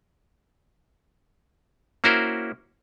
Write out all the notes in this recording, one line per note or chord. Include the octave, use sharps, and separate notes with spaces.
A#3 C#4 E4 F#4 A#4 C5